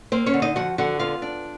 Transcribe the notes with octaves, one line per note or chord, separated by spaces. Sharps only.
A#3 C4 C5
C#4 C#5
D3
D#4 D#5
F3 F#4 F#5
D3 F#4 F#5
B3 F4 F5
D4